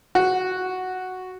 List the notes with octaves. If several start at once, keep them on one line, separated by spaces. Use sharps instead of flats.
F#4